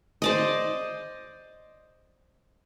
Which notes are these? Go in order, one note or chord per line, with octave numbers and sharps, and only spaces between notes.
C5 D5 D#5